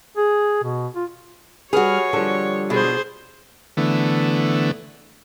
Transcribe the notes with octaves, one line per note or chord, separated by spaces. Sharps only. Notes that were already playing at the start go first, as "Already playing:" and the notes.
G#4
B2
F4
G3 F#4 G#4 B4 C#5 F6
D3 F3 G3 A4
B2 G#4 C5
D3 E3 A3 B3